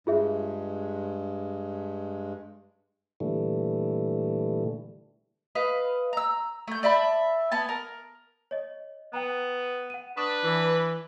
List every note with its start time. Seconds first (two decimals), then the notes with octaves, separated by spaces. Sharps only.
0.07 G2 G#3 F4 G#4 E5
3.20 A#2 D3 E3 G3 A3
5.55 B4 D#5 F5
6.13 A#5 E6
6.67 A3 G6
6.83 D5 E5 A5 B5
7.52 B3 G#5 A5
7.69 A#4
8.51 C#5 D#5
9.13 B3 G5 A#5
9.90 F#5 D#7
10.17 D4 B4 C#6 D#6 E7
10.44 E3